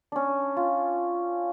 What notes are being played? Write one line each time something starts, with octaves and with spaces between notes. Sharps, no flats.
C#4 D4
F4